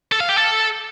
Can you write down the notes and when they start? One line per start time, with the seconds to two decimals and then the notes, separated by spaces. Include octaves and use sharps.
0.12 A4
0.20 F5
0.29 G4
0.38 A4